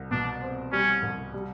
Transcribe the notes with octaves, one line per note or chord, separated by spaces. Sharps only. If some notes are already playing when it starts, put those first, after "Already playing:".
Already playing: C2
B2 D4
C4
G3 C#4
C2
G3